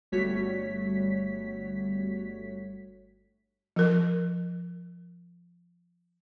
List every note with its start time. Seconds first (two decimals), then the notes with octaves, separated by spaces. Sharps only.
0.12 G1 G3 A3 F#4 C#5 B6
3.76 F3 A#4